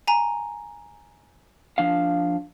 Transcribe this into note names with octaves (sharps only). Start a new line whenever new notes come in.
G#5 A#5
F3 D4 F5